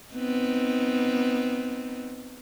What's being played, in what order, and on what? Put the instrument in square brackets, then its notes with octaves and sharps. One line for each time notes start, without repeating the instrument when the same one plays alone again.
[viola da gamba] B3 C4 D#4